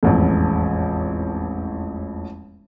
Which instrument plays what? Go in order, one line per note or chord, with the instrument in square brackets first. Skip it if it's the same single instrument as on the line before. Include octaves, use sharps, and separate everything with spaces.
[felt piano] E1 A1 F2